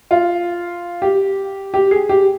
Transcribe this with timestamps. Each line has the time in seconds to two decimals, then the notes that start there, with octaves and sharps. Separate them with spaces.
0.11 F4
1.02 G4
1.74 G4
1.91 G#4
2.09 G4